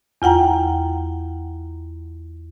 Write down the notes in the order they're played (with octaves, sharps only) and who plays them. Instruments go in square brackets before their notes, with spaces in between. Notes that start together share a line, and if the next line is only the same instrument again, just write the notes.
[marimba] E2 F4 F#5 G5 A#5